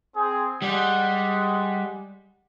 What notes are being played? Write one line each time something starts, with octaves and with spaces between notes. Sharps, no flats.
C4 G#4
G3 G#3 D5 F#5